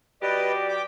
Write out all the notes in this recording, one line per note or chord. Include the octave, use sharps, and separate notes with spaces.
F#3 G4 B4 D5 D#5
G5 D6